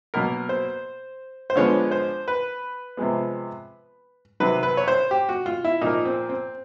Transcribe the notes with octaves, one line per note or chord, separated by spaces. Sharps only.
B2 F#3 A#3 A#4
C5
C5
D3 F3 G#3 B3 C#5
C5
B4
C3 F3 G#3 B3
C3 D#3 F#3 B4
B4
C#5
C5
G4
F#4
F4
E4
A#2 F3 A#3 D#4
C4
C4